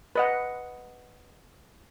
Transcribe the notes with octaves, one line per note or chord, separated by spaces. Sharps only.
B4 D#5 F#5